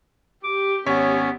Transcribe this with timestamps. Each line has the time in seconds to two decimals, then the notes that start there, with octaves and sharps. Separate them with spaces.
0.44 G4 D6
0.86 G#1 B3 C#4 C#5 B6